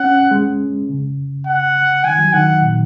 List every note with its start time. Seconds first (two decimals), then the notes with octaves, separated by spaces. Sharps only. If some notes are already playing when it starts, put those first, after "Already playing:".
Already playing: C#4 F#5
0.31 G#3
0.89 C#3
1.47 F#5
2.04 D#3 G#5
2.19 F#3
2.33 D#3 F#5
2.62 A#2